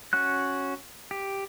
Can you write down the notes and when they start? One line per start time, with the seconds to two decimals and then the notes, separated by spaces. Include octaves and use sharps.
0.13 C#4 F#4 F#6
1.11 G4